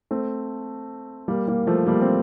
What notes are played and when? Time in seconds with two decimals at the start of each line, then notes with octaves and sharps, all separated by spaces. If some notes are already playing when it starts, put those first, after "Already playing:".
0.11 A3 C4
1.28 G3 A#3
1.47 G3 A#3
1.67 F3 A3
1.87 G3 A#3
2.01 A3 C4